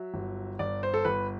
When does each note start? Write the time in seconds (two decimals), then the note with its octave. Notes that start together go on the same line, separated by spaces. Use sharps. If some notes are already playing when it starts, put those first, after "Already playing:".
Already playing: F#3 E5
0.14 G1
0.59 G1 D5
0.83 C5
0.94 A4
1.05 G1 B4